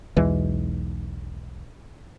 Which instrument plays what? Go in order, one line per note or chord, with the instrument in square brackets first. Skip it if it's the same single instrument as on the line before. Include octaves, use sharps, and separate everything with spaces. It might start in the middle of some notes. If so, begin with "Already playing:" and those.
[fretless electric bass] B1 E2 E3 G#3